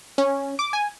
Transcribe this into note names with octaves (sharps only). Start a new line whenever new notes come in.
C#4
D6
G#5